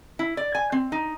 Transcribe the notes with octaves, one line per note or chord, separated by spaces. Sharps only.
E4
D5
G#5
C4
D#4